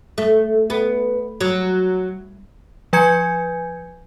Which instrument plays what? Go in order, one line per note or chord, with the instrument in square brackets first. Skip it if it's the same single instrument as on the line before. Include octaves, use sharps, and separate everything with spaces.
[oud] A3
B3
F#3
[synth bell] F3 B4 G#5 G6 G#6 C#7